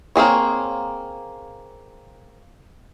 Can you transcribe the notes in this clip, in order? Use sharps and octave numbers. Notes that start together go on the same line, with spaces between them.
A#3 C4 G#4 C#5